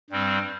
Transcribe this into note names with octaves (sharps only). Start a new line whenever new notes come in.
G2 G3 C4